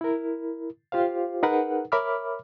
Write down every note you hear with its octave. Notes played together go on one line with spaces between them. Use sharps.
E4 A#4
F4 G4 C5 F5
D#4 G#4 A#4 B4 F#5
A#4 C#5 E5 B5 D6 F6